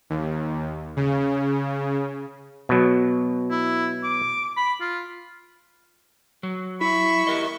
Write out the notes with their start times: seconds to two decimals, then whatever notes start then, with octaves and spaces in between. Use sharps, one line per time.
0.10 D#2
0.97 C#3
2.69 B2 F#3
3.50 E4
4.03 D6
4.57 B5
4.81 F4
6.43 F#3
6.81 E4 E5 B5 C#6
7.27 G4 A#4 D#5